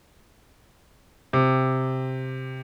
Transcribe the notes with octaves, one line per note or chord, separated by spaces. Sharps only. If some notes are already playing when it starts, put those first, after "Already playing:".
C3